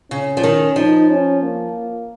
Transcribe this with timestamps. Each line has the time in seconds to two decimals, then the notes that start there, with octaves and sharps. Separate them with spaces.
0.11 C#3 C#4
0.37 F3
0.43 D#3
0.76 F3 D#4
1.09 C#4
1.42 A#3